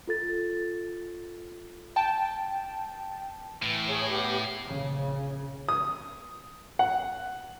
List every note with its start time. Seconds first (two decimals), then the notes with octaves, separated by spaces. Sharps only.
0.07 F4 A4 A6
1.96 G5 A5
3.62 A2 E3
3.89 G#4 C#5
4.08 B3 G4
4.70 A#1 C#3
5.69 D#6
6.79 F#5